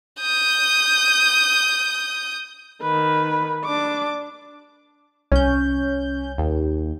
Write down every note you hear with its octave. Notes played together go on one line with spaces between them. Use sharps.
D#6 G6
D#3 B4
D4 D6
C2 C#4 G6
D#2